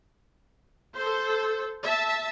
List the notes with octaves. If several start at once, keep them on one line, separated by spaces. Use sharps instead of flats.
A4 C5
E5 A5